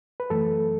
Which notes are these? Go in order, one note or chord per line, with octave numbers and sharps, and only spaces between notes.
B4
F#2 E3 A3 A4